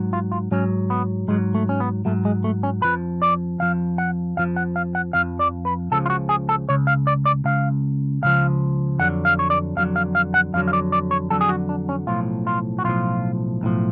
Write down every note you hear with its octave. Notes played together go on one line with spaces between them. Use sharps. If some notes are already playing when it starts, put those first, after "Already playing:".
Already playing: G#2 F#3
F4
F4
G#2 F#3 C#4
B3
G#2 F#3 G#3
A3
C#4
B3
G#2 F#3 A3
G#3
A3
C#4
F2 F3 B4
D5
F2 F3 F5
F#5
F2 F3 F5
F#5
F5
F#5
F2 F3 F5
D5
B4
C#2 C#3 F3 A4
F4
F#4
G#4
A4
C#2 C#3 C#5
F5
D5
D5
C#2 C#3 F5
C#2 C#3 F3 F5
F2 D3 F#3 F#5
F5
C#5
D5
F2 D3 F#3 F5
F5
F5
F#5
F2 D3 F#3 F5
F5
D5
D5
C#5
F2 D3 F#3 A4
G#4
F#4
D4
C#4
B1 A2 F3 F4
F4
F#4
B1 A2 F3 F4
B1 A2 F3